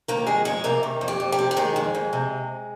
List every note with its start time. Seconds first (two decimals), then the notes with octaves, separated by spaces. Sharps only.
0.08 D#3 A#3 A#4
0.27 F2 G#3 G#4
0.45 F2 G#3 G#4
0.64 C3 A#3 A#4
0.83 D#3
1.01 F2
1.08 G4
1.20 F2
1.32 G4
1.39 C3
1.51 G4
1.56 D#3 G#3 G#4
1.76 F2
1.95 F2
2.13 C3